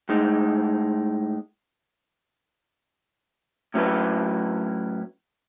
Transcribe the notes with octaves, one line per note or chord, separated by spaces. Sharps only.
A2 G#3 D#4
A2 F#3 C#4 E4 B4